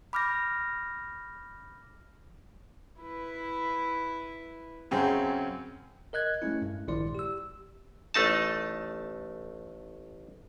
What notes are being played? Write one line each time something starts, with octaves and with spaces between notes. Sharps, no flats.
B5 D6 F6 G6 A#6
E4 B4
F#2 C#3 C4
A#4 D#5 F#6 G#6
G#3 A3 C#4 E4
G2
A#1 D#3 G#3 E4 D5 C6
G4 E6
A1 A3 D#4 A5